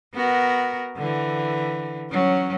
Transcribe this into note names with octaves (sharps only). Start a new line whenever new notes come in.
B3 F#4 A#4
D3 E3
F#3 C#4